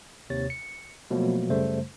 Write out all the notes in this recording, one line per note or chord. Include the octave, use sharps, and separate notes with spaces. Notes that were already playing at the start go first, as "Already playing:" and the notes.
D#2 C3 C#5 A6
C#7
B2 F3 F#3 A3 A#3
F#2 C#3 G3 A3 C5